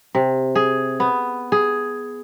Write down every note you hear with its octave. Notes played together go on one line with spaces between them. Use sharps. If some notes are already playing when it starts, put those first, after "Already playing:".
C3
G#4
B3
G#4